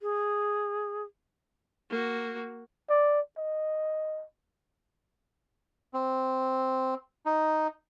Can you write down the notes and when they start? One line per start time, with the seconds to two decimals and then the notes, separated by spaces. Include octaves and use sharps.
0.01 G#4
1.90 A#3 F#4
2.90 D5
3.38 D#5
5.93 C4
7.26 D#4